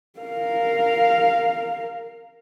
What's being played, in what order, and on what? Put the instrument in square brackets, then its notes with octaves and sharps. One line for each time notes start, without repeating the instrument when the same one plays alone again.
[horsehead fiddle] A#4 F5